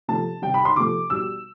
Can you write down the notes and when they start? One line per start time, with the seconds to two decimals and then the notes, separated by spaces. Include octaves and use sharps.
0.08 C3 F3 A3 A5
0.42 C3 G3 G5
0.54 B5
0.65 C6
0.76 C3 F3 A3 D6
1.10 B2 G3 E6